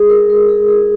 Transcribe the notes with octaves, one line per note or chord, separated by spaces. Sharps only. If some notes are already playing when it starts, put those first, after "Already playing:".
Already playing: G#3 G#4
A#4
G#3 A#4
G#4
E4 G#4